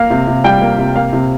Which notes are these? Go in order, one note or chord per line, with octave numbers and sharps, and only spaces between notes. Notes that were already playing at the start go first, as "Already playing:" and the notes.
Already playing: A#3 F5
C3
C3
G3 G5
A#3
C3
A#3 F5
C3